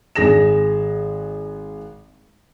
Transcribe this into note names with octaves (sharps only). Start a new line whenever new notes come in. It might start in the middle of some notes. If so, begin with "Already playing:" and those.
G#1 G#4 A#6 E7